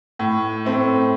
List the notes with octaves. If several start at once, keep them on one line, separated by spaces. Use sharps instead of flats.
A2
A3 C4